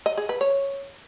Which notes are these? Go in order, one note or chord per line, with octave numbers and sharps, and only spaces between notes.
D#5
G#4
B4
C#5